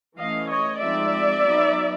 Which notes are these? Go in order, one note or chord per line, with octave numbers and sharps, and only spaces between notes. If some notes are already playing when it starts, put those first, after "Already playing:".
E3 A3 C#4 D#5 F5
C#5 D#5
F3 G#3 C4 D#4 D5 E5
F#3 B3 D#4